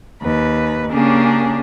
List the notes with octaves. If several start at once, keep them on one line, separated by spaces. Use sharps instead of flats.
D#2 B4
C#3 A#3 C#4 D4 G4 G#4